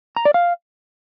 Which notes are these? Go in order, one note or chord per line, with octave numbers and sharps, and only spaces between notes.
A#5
D5
F5